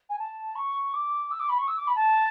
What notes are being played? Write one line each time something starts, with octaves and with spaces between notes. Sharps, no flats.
G#5
A5
C#6
D6
E6
D6
B5
C#6
E6
D6
B5
A5